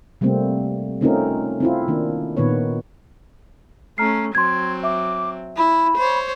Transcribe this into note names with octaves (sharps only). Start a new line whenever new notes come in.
C3 G3 A3 A#3 C4
A3 C4 C#4 D#4 F4 A#4
C4 E4 F4
D#3 A#3 D4
A#2 D#3 B3 B4 C#5
A3 C#4 A#5 F6 C7
F#3 C4 C6 G#6
E5 D6
E4 B5
C5 C#5